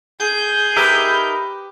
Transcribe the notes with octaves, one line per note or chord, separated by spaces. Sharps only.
G#4 G6
D#4 G4 A#4 B4 E5